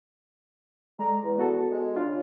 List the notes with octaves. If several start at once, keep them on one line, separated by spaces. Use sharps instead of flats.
G#3 A4 D5 A#5
E2
B3 F#4 A4
G#3
D#2 C#3 D4 F4 F5